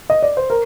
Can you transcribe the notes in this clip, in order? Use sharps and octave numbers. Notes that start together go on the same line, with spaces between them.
D#5
D5
C5
A#4